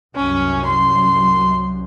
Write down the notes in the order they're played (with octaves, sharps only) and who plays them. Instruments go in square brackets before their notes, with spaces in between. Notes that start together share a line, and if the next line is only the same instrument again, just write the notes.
[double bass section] C2 F#2 [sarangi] C#4
[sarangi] C6